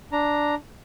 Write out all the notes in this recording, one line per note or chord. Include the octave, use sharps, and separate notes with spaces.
D4 A#5